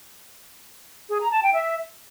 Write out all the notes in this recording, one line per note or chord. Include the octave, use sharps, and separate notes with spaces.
G#4
A#5
A5
G5
E5